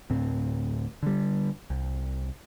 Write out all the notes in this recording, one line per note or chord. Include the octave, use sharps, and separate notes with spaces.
D2 A2 C4
D3 G3
C2